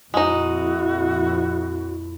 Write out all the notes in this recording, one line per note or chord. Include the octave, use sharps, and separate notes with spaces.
F2 A#2 G#3 D#4 E4 F#4